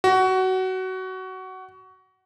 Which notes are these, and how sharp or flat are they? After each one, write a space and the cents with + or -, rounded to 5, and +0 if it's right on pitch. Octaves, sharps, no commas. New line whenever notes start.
F#4 +20